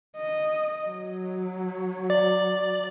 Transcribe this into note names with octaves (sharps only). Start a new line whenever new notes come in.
D#5
F#3
D5